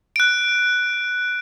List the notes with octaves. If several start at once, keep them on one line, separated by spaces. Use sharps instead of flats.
F#6 D7